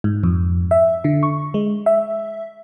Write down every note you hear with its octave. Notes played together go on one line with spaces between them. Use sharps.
G#2
F2
E5
D3
C#6
G#3
E5